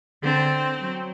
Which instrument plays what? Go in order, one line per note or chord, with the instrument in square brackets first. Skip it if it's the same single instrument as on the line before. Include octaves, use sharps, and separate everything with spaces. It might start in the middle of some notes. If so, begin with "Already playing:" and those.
[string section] D3 [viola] C4
[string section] F#3